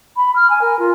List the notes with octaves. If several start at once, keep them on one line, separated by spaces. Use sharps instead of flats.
B5
F6
G#5
A#4
F4